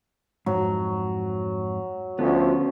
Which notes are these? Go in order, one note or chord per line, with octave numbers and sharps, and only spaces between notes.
F2 G#2 F#3
D2 D3 F3 B3 C#4